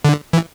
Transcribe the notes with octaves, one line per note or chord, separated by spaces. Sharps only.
D3
E3